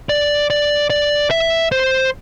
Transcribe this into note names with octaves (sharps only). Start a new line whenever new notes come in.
D5
D5
D5
E5
C5